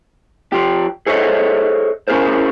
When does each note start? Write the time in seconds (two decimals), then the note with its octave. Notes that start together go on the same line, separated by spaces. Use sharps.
0.52 F3 G4
1.07 G#4 A4 C5 C#5 D#5 E5
2.08 C#4 E4 G#4 A#4 C5